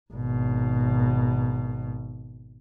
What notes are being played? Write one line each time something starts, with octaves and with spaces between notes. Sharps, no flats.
G#1 B2